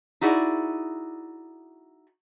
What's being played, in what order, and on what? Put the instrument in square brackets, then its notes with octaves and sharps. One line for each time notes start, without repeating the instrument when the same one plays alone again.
[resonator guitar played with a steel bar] D#4 E4 F#4 G#4 D5